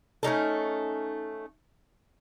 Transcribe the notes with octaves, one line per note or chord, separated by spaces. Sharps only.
A3 C#4 D#4 A4